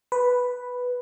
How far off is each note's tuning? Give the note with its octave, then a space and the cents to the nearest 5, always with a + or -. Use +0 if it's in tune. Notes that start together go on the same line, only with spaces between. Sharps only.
B4 +0